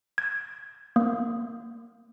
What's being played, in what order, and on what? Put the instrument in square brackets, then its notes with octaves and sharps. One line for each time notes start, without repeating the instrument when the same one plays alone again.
[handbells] G#6
A#3